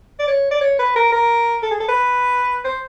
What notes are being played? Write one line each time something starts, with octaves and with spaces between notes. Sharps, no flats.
D5
C#5
D5
C#5
B4
A#4
A#4
A4
G#4
A4
B4
C5